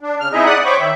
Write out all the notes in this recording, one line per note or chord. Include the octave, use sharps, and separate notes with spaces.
D4
C#3 F6
C4 D#4 E4 G#4 D#5 E5
D5 F#5 D#6 F#6
C5 C#5 G5 B5 C#6 D6
D#3 E5